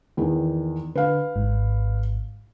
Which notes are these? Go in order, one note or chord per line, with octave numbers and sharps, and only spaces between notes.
E2 D#3
D3 B4 F5
G#1 G#2